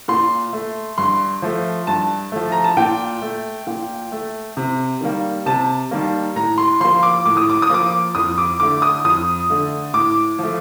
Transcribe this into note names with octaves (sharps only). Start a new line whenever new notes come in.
A#2 C6
A3
G2 C6
F3 A3
G2 A5
F3 A3
A#5
A5
A#2 G5
A3
A#2
A3
C3
D#3 G3 A#3
C3 A5
D#3 G3 A#3
A2 A#5
C6
F3 A#3 C6
D6
A2 D6
D#6
D6
D#6
F3 A#3 D6
F2 D#6
D6
D3 A3 D6
D#6
F2 D#6
D3 A3
A2 D6
F3 A3